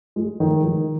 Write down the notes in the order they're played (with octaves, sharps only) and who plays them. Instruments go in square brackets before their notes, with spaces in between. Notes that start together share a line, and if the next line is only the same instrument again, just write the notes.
[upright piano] G#3
D#3
D#3